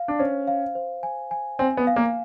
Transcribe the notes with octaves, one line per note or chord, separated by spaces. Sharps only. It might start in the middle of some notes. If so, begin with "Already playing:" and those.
Already playing: F5
D4
C#4 C5
F5
C5
G#5
G#5
C4 G#5
B3
F5
A#3